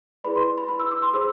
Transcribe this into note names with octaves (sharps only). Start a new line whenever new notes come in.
E4 G#4 B4 D5 B5
C6
B5
B5
E6
D6
C6
G#4 C5 E6